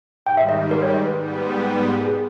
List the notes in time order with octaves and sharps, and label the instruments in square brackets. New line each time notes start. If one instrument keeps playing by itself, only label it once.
[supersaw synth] G#2 D#3 G3 [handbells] G5
[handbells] E5
D#5
A#4
C#5
D#5
B4
[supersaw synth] G#2 G3 B3
[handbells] A#4
G#4